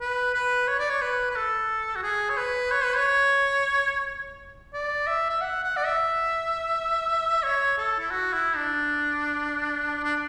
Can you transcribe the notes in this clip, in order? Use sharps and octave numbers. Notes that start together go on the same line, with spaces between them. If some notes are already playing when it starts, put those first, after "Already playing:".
B4
B4
C#5
D5
C#5
B4
B4
A4
F#4
G#4
C#5
B4
C#5
B4
C#5
D5
E5
E5
F#5
F#5
D5
E5
C#5
A4
E4
F#4
E4
D4
D4